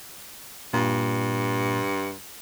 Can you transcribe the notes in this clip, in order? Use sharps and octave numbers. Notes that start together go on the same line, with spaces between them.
G2 A#2